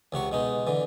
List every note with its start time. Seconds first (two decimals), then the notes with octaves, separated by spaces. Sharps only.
0.12 C#2 C3 F#4 C#6
0.32 B2 G#3 D#4
0.67 D3 E3